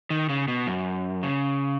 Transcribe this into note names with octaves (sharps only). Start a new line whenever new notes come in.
D#3
C#3
B2
F#2
C#3